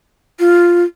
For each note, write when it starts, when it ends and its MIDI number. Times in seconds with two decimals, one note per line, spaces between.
0.40 0.84 65